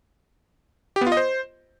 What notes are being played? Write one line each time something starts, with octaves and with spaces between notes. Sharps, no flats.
G4
B3
F4
D#5
C5